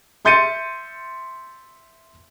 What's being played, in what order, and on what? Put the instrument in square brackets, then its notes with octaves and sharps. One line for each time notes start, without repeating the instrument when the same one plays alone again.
[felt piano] E5 C6 G6 A6 C#7 D#7